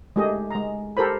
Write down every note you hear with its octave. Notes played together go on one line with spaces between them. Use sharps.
G#3 A3 G4 G#4 D#5
G#3 A#5
G4 A4 A#4 C5 B5